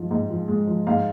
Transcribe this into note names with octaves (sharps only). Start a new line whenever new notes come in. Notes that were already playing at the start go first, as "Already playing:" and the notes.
Already playing: G#2 F3
G#2
F3
G#3
F3
G#2 F5